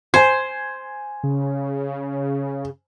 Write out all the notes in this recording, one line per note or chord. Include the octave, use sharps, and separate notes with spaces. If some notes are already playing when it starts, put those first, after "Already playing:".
C5 G#5 G#6
C#3